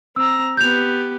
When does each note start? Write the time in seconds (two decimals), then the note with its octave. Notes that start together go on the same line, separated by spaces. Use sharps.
0.16 C4 A#5 E6
0.57 B3 G4 G6 F7